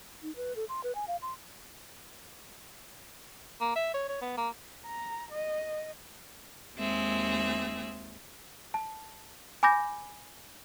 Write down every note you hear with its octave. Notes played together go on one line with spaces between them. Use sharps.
D#4
B4
A4
C6
B4
G#5
F5
C6
A#3
E5
C#5
C#5
B3
A#3
A#5
D#5
D#2 G#3 C4 G#4 E5
A5
G#5 B5 D6 G6 A#6